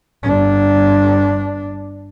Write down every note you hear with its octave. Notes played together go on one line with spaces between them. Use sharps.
G1 D4